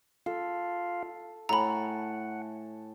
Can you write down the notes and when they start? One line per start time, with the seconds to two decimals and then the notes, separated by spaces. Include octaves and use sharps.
0.26 F4 A4 F5
1.49 A2 A3 F#5 G#5 A#5 B5